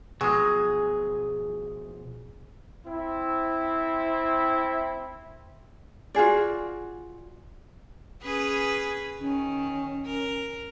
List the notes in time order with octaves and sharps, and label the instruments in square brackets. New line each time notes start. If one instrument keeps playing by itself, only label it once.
[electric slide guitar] B2 F3 [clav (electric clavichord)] F#3 G#3 [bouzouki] G#4
[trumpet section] C4 E4
[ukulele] F4 F#4 G#4 D5
[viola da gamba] C#4 G#4 B4
[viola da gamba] D#3 [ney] C#4
[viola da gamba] A#4